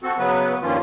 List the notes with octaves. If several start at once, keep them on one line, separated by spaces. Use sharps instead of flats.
C4 F#4 A4
C#3 F#3 B3 B4
G2 D#3 F3 A#3 C#4 F4